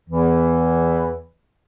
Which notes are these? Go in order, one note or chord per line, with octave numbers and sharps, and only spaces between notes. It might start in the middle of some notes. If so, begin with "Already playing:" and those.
E2 E3